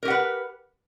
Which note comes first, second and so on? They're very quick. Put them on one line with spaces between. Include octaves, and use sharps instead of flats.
A#4 G4 F#5 B4